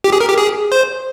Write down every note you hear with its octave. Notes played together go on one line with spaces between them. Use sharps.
G4
G#4
A#4
G4
G#4
C5